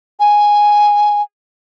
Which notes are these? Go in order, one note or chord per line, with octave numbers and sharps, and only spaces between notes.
G#5